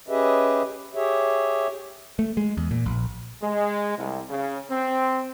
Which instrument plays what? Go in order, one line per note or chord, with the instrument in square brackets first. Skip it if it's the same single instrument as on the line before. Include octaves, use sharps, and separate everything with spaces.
[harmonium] C#4 G4 G#4 B4 D#5 E5
G4 G#4 C#5 E5
[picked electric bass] A3
G#3
E2
A#2
A#1
[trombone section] G#3
C2
C#3
C4